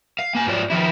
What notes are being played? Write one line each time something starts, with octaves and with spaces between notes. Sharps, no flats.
F5
A#3 G#5
G#2 F4 C#5 D5
D#3 F3 E4